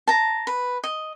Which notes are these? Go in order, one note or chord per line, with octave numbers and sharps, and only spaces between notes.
A5 A#5
B4
D#5